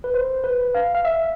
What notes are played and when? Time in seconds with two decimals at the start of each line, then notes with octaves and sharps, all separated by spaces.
0.04 B4
0.14 C5
0.44 B4
0.75 F5
0.95 F5
1.05 E5